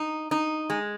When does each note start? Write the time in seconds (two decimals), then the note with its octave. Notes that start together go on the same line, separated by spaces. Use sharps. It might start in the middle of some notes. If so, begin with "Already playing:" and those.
Already playing: D#4
0.31 D#4
0.70 G#3